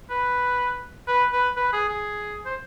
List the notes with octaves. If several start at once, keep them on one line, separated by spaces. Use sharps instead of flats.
B4
B4
B4
B4
G#4
G#4
C5